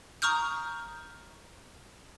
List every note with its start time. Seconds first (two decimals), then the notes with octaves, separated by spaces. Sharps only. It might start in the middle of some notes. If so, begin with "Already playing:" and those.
0.22 A#5 C#6 D#6 F6 G6